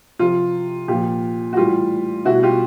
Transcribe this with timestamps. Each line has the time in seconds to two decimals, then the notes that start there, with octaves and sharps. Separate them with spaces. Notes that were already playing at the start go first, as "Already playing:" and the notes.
0.19 C3 F3 F4
0.88 A#2 F3 F4 G4
1.53 F#4
1.57 A2 E3 G3 F4 G4
2.25 B2 G3 E4 F#4
2.43 F4 G4